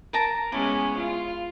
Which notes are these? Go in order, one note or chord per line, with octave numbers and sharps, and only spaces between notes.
A#4 A5 A#5
G#3 B3 C#4 E4 D6
F4